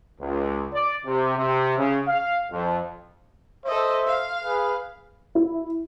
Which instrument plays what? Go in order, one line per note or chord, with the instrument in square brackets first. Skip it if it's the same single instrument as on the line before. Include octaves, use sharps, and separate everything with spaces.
[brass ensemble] C#2
D5
C3
C3
C#3
F5
F2
[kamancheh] A4 D#5 [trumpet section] C5 E5
[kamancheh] F5
[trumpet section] G#4 B4
[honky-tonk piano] E4